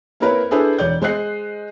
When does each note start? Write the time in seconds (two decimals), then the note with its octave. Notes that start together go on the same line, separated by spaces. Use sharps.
0.20 A#3 C4 E4 A#4 B4 C#5
0.51 D4 E4 G#4 A4 B4 C5
0.78 E1 C#5 D5 G6
1.02 G#3 C5 D#5 F#6 C7